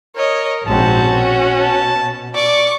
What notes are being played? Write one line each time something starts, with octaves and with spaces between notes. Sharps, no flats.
A#4 C#5 D#5
A#1 G#2 C4 C#4 F#4 A5
B2
A5
D5 C#6 D6